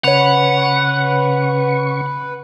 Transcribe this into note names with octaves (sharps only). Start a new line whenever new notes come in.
C#3 B4 C#5 F#5 C#6 F7